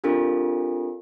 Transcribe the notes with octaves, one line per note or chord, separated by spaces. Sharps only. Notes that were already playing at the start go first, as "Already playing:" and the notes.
C4 D4 F4 G4 A4 A#4